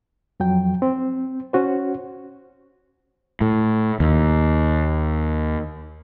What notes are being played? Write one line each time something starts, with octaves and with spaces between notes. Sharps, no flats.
F2 F#3 G5
C4
C#4 F#4 C5
A2
D#2